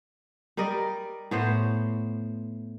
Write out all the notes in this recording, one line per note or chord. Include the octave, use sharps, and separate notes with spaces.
G3 A#4 D5 D#5
A2 B3 C5